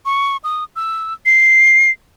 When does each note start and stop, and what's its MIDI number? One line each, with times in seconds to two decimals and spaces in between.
0.06 0.37 85
0.44 0.64 87
0.76 1.14 88
1.26 1.91 96